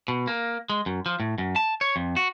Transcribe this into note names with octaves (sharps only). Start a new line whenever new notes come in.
B2
A#3
G#3
F#2
F3
A2
F#2
A5
C#5
F2
F#4